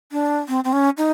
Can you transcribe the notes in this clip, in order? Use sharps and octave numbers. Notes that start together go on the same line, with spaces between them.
D4
C4
C4
C#4
D#4